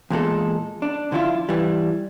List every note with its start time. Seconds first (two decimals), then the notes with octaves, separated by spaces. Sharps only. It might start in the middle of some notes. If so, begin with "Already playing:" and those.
0.10 E2 A#2 G#3 A4
0.82 D4
1.12 D3 F3 E4 F4
1.49 E3 G3